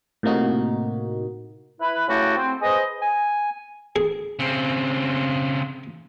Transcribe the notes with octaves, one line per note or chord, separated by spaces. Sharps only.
A2 C3 A#3 D#4 F#4
E4 B4
C#3 A3 E4 F#4 G4 A4
C4
G#4 B4 C5 D#5
G#5
G#4
C#3 C4